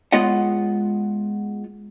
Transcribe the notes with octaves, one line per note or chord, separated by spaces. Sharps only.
G#3 B3 F4 C#5 D#5 F#5